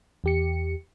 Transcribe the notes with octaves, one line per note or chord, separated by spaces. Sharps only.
E2 G4 C#7